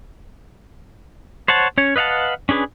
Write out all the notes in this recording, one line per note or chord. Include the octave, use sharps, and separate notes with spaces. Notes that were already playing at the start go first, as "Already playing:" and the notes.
C5 C#5 F#5 A5
C#4 C#5
B4 D#5 F5 F#5 A5
C#4 D4 G#4 B4